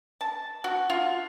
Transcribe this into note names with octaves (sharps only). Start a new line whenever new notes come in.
A5
F#4
F4